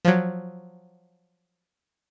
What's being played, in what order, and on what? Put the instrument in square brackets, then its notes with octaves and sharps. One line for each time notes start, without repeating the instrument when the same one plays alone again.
[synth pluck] F3 F#3